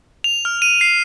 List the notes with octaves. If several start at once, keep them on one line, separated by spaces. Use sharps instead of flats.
F7
F6
D#7
C7